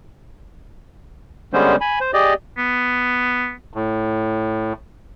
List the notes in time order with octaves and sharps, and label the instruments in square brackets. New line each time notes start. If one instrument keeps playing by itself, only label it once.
[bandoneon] D3 G3 G#3 B3 C#4 C5
G#5 B5
C5
G4 G#4 D5 D#5
[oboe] B3
[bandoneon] A2